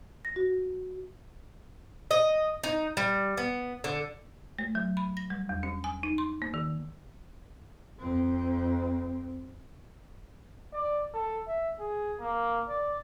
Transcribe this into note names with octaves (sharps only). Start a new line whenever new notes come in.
A#6
F#4
D#5
D#4
G3
B3
D3
A3
F#3
B5
A#6
G3
E2
C#4
G#5
D#4
C6
A#3
D#3
F2 C4
D5
A4
E5
G#4
A#3
D5